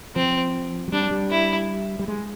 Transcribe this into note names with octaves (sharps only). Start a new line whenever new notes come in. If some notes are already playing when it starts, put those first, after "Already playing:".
F3 C4
F#3
G3 D4
G3
E4
G3
G#3